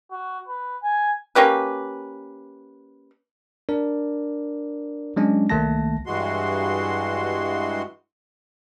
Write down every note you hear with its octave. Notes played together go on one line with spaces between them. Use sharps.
F#4
B4
G#5
A#3 C#4 G4 B4
D4 A#4 D5
F#3 G#3 C#4 D4
C2 D#3 A3 A#3 A5 A#6
G2 E3 G#3 F#4 C6